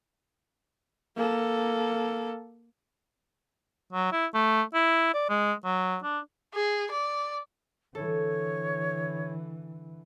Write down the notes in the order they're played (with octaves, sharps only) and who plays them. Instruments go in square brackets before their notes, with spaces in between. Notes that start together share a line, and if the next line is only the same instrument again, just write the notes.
[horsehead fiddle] A#3 A4
[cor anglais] F#3
E4
A3
E4
D5
G#3
F#3
D4
[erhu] G#4
D5
[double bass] D3 E3 [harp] A4 [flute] C#5